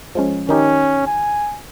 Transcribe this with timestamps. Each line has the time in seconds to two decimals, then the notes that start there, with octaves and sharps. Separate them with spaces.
0.15 F3 G#3 C#4
0.49 D#3 C#4 D#4 G4
1.07 G#5